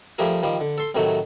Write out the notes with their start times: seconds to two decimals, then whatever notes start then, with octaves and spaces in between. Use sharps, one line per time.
0.18 F3 G3 A3 G4 G#4 A#4
0.43 D#3 F3 G3
0.60 D3
0.78 A4 C6
0.95 A2 C3 D#3 F#3 A3